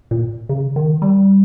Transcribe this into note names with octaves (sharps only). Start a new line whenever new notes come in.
A#2
C#3
D#3
G3